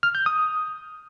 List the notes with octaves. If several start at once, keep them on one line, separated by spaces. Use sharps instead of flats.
F6
G6
D#6